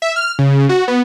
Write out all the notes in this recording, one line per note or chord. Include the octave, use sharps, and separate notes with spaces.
E5
F6
C#3
F#4
B3